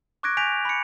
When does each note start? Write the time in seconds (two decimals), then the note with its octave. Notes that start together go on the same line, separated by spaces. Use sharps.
0.23 C#6 D6 F#6 G#6 A#6 D7
0.37 G#5 G6 A#6 B6 D7 F7
0.65 B5 C#7